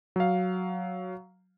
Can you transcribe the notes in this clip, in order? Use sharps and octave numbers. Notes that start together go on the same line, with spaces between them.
F#3 F5